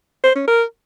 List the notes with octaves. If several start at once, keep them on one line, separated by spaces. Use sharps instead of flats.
C5
C#4
A#4